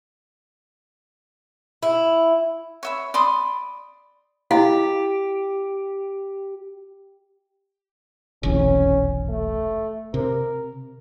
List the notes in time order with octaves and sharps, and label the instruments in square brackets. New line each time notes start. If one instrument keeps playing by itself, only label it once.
[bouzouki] E4
[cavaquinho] C#5 E5 B5
D5 B5 C6 D#6
[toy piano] E4 D#5 F5 [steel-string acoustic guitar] G4
[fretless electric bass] F1 B1 E2 [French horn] C#4
[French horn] A3
[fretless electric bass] C3 [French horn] A#4